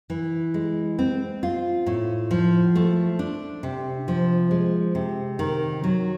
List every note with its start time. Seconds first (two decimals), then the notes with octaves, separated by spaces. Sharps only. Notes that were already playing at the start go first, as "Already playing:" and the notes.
0.10 E3
0.54 G#3
0.99 C4
1.43 F4
1.86 A2
2.31 F3
2.75 A3
3.19 D4
3.63 C3
4.08 F3
4.51 G#3
4.95 C3
5.39 D#3
5.84 F#3